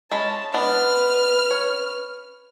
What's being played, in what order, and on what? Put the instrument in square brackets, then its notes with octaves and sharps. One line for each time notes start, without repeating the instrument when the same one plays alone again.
[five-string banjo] G#3 C#4 B5 [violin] A5
[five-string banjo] G#3 B3 D4 [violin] B4 F6
[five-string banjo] C#5